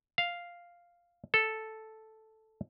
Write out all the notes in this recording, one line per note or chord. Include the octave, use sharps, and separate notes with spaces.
F5
A4